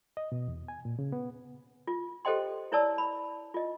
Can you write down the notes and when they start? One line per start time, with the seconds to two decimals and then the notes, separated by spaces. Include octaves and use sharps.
0.17 D#5
0.32 B2
0.48 E2
0.68 G#5
0.85 A#2
0.99 C#3
1.12 B3
1.87 F4
2.25 G4 A4 C5 D#5 G5 C6
2.72 E4 B4 C#5 D5 A5 E6
2.98 B5
3.54 F4 D#5